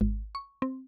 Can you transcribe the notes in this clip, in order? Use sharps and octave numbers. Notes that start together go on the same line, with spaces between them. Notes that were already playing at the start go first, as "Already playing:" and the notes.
G#1
C#6
C4